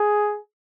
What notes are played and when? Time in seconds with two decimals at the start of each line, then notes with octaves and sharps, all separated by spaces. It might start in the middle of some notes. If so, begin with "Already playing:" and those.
Already playing: G#4